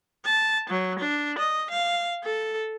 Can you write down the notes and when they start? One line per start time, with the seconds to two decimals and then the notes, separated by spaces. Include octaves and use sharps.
0.25 A5
0.69 F#3
0.99 D4
1.38 D#5
1.70 F5
2.24 A4